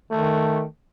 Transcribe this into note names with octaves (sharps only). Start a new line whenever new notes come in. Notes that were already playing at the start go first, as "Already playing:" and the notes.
D#3 A3